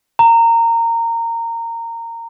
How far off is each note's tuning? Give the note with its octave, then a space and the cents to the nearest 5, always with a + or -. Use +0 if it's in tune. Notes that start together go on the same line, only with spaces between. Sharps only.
A#5 -20